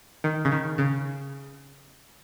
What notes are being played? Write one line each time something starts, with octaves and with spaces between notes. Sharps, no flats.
D#3
C#3
D#3
C#3